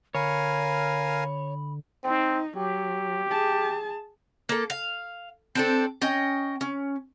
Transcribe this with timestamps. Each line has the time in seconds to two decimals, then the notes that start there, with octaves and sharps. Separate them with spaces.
0.15 D3 A#4 C#5 F5 G#5 B5
2.04 C4 D#4
2.57 F#3 G4
3.29 G#4 A5
4.49 A#3 A4
4.70 F5
5.55 C4 D4 A4
6.02 C#4 D#5 G5
6.61 C#4